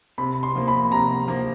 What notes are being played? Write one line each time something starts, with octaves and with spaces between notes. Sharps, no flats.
C3 B5
C6
F3 A#3
B5
C3 A#5
F3 A#3